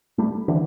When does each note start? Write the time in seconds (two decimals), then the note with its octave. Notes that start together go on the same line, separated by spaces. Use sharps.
0.18 G3 A3
0.48 D3 E3